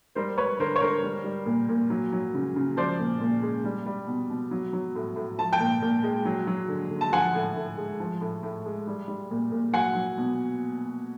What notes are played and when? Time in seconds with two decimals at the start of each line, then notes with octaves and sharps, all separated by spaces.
0.15 G3 A#4 C5
0.38 G3 B4 C#5
0.59 D3 A#4 C5
0.76 C#5
0.81 D3 A#4 C5
1.03 G3
1.24 G3
1.46 A#2
1.69 A#2
1.90 F#3
2.12 F#3
2.34 C#3
2.56 C#3
2.77 F3 C5 D5
2.99 A#2
3.20 A#2
3.43 G#3
3.64 G3
3.86 G3
4.07 B2
4.30 B2
4.51 F#3
4.73 F#3
4.95 A2
5.16 A2
5.38 F3 A5
5.53 G5 A5
5.60 A#2
5.82 A#2
6.03 G#3
6.25 F#3
6.47 F#3
6.68 D3
6.90 D3
7.01 A5
7.13 F3 F#5 G#5
7.35 A2
7.56 A2
7.77 G#3
8.00 F3
8.21 A2
8.43 A2
8.65 G#3
8.87 G3
9.08 G3
9.31 A#2
9.52 A#2
9.73 F#3 F#5 G#5
9.95 F#3
10.18 B2